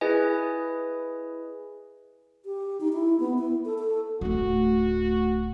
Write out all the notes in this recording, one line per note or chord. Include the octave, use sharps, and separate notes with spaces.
E4 G#4 B4 D#5 G#5
G4
D#4
E4
B3
E4
A4
A4
D1 A3 F#4